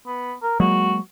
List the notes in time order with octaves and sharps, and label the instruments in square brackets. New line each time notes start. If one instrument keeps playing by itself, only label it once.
[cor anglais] B3
A#4
[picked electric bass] F#3 G#3 A#3 [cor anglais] F#4